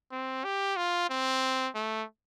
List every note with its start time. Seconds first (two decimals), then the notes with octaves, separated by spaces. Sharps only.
0.12 C4
0.44 G4
0.76 F4
1.10 C4
1.75 A3